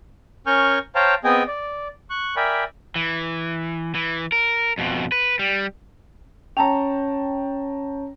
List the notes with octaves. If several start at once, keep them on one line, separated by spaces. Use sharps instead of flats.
C#4 A#4 G#5 C#6 F6 G6
C5 C#5 F5 G5 A5 A#5
B3 C4 G#4 D#5 G5 G#5
D5
C#6 F#6
A#4 D5 E5 G5 G#5 B5
E3
E3
A#4
F2 B2
B4
G3
C#4 C#5 G5 A5 A#5